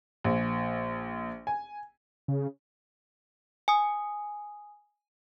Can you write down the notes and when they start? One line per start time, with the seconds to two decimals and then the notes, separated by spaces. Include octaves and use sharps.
0.24 A#1
1.47 G#5
2.28 C#3
3.68 G#5 D#6